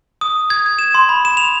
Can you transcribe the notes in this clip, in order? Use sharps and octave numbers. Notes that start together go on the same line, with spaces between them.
D#6
G#6
G#6
E7
C6
B5
E7
F7